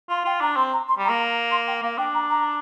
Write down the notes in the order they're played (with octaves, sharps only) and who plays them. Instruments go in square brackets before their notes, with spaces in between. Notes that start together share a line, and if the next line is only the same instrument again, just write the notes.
[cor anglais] F4 [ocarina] C6
[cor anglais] F4 [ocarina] G5
[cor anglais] D4 [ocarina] A#5
[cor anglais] C4 [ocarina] C6
[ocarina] A#5
C6
[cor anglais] G3
[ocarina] A#5
[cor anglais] A#3
[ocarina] C6
G5
[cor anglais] A#3 [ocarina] F5
[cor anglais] D4 [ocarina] G5
[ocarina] A#5
A#5